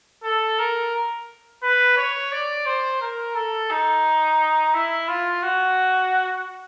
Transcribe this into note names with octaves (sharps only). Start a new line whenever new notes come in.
A4
A#4
B4
C#5
D5
C5
A#4
A4
D#4
E4
F4
F#4